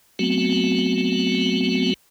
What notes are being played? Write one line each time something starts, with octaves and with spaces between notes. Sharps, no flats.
F#3 A3 B3 C4 F#4